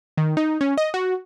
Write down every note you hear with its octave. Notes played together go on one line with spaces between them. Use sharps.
D#3
D#4
C#4
D#5
F#4